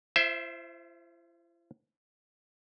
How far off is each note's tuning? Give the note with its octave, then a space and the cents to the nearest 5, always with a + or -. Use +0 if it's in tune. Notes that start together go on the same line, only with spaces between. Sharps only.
E4 +45 C5 +0 E5 +0